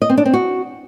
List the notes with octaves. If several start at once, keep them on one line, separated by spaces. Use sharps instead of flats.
D#5
C4
D4
C4
F#4